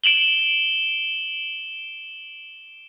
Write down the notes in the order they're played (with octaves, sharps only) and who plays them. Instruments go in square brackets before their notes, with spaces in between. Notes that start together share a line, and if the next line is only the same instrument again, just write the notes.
[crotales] D7 E7 F#7 G7